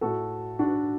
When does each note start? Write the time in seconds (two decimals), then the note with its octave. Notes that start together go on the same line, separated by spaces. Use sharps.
0.01 A2 A3 F#4 A4
0.59 D4 F#4